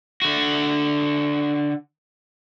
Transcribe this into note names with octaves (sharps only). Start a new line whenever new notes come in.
D3 F#4